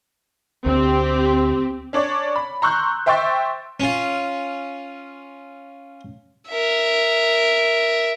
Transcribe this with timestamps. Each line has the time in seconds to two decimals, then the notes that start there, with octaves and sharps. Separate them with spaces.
0.66 D2 C4 G4
1.93 C#4 D4 C#5 D5
2.36 B5
2.62 A#5 C6 C#6 E6 F#6 G6
3.06 C5 E5 G5 C6 C#6 A6
3.80 C#4 F4
6.49 A#4 E5